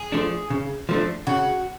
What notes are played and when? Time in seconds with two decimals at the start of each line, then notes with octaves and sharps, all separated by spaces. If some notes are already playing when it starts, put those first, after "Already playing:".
Already playing: G#4
0.12 F3 A3 D4
0.50 C#3
0.89 F3 A3 D4
1.27 C#3 F#4